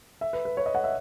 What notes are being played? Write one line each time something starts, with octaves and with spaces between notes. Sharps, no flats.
E5
B4
B4
C#5
D#5
F#5
E5